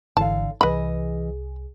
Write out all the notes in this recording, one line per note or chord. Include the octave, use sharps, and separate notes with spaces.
G#1 D3 E3 F5 A5
C2 E3 G#4 B4 D#5 B5